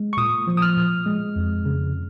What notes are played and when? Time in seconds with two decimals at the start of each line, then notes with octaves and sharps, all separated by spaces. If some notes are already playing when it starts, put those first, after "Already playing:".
Already playing: G#3
0.13 C#6
0.17 A#2 D#6
0.47 F3
0.57 D#6
0.62 F6
0.77 A#2
1.06 G#3
1.36 F2
1.66 C#3